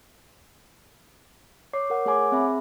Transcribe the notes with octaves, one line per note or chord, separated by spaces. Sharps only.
C#5 D6 C7
A#4 F#5
A3 G#4 C#5 F#5 G#5 D6
C4 G#4 E5 B5